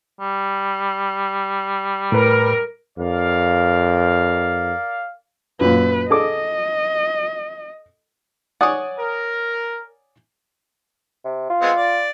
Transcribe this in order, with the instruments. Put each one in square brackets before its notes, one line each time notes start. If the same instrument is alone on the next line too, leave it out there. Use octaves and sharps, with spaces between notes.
[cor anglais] G3
[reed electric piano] A2 B4 [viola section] A#4
[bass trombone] F2 [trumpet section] A#4 D5 F5
[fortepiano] F#2 A#2 [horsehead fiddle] B4
[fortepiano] G#4 A4 D6 [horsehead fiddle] D#5
[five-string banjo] C#5 F#5 [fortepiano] D5 G#5 D#6
[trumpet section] A#4
[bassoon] C3
F4
[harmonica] G#3 B3 C4
D5